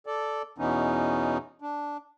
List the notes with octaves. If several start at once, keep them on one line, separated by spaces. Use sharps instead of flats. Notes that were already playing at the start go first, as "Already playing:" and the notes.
A4 D5
E2 B2 E3 B3 C#4 D#4
D4